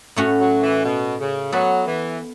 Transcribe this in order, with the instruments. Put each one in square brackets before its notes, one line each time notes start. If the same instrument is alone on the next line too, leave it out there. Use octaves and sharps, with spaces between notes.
[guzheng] A2 A3 C#4 F#4
[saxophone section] F#3
E3
B2
C#3
[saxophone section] F#3 [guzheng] B3 A4 E5
[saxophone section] E3